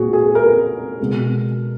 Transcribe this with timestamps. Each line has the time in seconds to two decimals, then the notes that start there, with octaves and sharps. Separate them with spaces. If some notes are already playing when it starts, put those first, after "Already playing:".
Already playing: A#2 G#3 F#4 G#4
0.13 G#4
0.35 A#4
1.00 B2 G#3